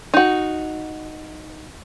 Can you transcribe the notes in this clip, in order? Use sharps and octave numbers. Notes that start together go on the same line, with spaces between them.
D#4 F#4